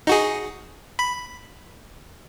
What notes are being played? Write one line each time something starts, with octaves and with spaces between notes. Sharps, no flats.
D#4 F#4 G#4
B5